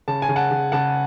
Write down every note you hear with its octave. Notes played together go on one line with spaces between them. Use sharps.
C#3 A5
G#5
C#3
F#5 A5
C#3
C#3 F#5 A5